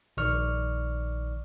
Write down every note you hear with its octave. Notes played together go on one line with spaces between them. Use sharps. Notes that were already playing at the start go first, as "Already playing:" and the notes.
A#1 D#3 D5 C#6 F6